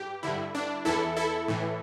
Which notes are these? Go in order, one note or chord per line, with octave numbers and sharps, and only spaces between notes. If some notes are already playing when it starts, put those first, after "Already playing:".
Already playing: G2 G4
G2 D3 E4
D4
E2 E3 E4 A4
E4 A4
A2 E3